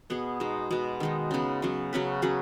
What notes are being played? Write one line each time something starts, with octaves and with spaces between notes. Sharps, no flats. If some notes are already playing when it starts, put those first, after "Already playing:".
B2 B3 G#4
B2 G#3 D#4
B2 G#3 B3
D#3 G#3 D#4
C#3 G#3 B3
C#3 F#3 B3
C#3 F#3 C#4 B4
F#3 C#4 G#4 B4